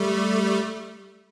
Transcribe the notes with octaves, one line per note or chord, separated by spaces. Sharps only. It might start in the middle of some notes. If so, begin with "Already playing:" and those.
Already playing: G3 A3